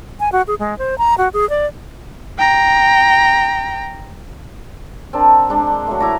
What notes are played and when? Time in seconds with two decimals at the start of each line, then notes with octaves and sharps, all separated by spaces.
0.20 G#5
0.32 F#4
0.47 G#4
0.59 G#3
0.78 C5
0.98 A#5
1.18 F#4
1.33 G#4
1.49 D5
2.39 G5 A#5
5.13 C4 D4 A#4 A5
5.49 G#3 D4 C6
5.87 F#3 A3
6.00 E4 D5 A#5